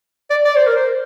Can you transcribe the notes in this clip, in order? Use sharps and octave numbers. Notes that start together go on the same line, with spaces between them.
D5
D5
C5
A#4
C5